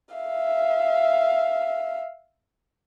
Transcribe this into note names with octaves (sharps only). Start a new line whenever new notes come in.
E5 F5